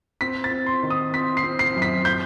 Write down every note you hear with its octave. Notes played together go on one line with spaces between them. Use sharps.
C4 B6
A6
C4
C6
D#3
D#6
C4 B6
C7
C4
C7
F#2
B6
G6